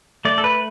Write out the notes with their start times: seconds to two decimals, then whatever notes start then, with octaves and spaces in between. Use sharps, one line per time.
0.25 A3 D5
0.38 A4
0.44 B4